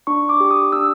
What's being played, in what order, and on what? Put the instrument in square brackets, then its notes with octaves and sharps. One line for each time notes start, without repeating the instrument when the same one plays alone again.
[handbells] D4 C#6
D6
G4
D#6
D4 E6